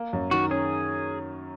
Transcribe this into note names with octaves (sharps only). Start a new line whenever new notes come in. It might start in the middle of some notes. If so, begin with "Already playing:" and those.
Already playing: A#3
F#2
D#3 F#4
C#4 G#4